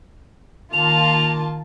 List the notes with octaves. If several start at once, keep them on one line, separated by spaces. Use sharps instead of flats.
D#3 A#3 F4 A5 F7